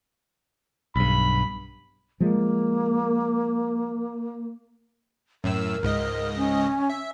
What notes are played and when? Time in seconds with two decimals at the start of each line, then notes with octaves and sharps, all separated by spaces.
0.96 B1 G2 B5
2.20 F3 G#3 A#3
5.44 F#2 A2 A#4 E6
5.83 C#2 G#2 D#5
6.36 C#4
6.90 E5